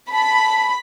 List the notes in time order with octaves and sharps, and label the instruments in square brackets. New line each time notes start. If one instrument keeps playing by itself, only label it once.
[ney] A5 [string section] B5